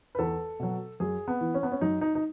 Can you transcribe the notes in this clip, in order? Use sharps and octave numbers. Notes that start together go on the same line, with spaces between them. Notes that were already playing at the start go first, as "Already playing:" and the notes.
B4
E2 A4
B2 F#3
F#2 G#4
B3
E3
C#4
B3
C#4
F#2 D#4
D#4
D#4